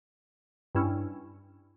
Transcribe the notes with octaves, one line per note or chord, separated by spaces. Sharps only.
G2 G3 C#4 E4